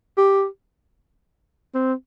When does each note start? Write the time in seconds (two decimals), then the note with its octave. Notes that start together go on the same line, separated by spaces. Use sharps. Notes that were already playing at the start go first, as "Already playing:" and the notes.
0.18 G4
1.75 C4